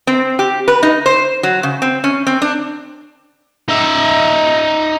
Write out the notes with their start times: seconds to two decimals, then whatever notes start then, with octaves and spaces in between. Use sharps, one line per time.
0.07 C4
0.39 G4
0.68 B4
0.83 D#4
1.06 C5
1.43 F#3
1.63 C#3
1.82 C4
2.04 C#4
2.27 C4
2.42 D4
3.69 D#4 E5